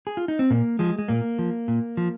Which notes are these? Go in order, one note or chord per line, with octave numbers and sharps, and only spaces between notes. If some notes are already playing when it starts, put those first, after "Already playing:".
G#4
F4
D#4
C4
A#2 A#3
F3 G#3
G#3
A#2 A#3
F3
A#2
F3